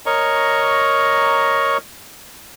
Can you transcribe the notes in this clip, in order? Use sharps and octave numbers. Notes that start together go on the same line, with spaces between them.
A#4 C#5 D#5 A#5 C#6